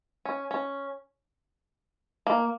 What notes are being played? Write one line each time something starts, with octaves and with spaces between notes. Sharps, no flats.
C#4
C#4
A#3